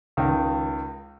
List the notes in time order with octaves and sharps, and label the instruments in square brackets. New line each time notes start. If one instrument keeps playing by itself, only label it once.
[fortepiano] C#2 D#3